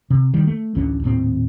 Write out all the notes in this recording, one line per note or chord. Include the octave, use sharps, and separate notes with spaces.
C3
D#3 G3
A3
A1 D2 D3 C#4
D#1 A2 C4